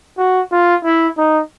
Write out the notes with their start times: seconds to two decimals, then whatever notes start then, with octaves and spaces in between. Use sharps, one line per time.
0.18 F#4
0.52 F4
0.85 E4
1.18 D#4